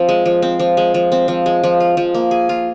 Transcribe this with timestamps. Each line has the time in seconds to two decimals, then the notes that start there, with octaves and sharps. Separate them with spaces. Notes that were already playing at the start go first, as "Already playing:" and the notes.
Already playing: F3 C4
0.09 G#3
0.26 F3
0.42 C4
0.59 F3
0.77 G#3
0.94 F3
1.12 C4
1.28 F3
1.46 G#3
1.64 F3
1.80 F4
1.97 F3
2.15 A#3
2.31 G#4
2.49 F4